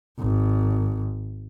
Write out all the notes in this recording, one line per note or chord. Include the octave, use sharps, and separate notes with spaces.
G#1